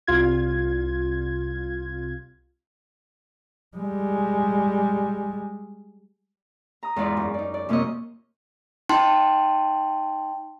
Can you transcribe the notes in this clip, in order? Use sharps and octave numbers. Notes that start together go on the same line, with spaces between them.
C2 F4 G#6
G3 G#3
A#5 D#6
E2 G#2 F4 D5
F#2
D#4 D5
D5
F#2 C3 A#3 F4 C#5 D#5
D#4 G5 A5 C6